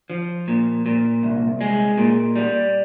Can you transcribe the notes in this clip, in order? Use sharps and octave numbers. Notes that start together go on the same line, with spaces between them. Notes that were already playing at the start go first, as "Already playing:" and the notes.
F3
A#2
A#2
C2
G#3
A#2
G3